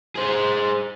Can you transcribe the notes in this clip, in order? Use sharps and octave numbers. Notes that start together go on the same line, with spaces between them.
G#4 C5